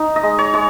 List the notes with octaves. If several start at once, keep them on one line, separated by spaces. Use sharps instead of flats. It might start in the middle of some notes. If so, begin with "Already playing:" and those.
Already playing: D#4
D#5
G#3
C#5
G#3 C#5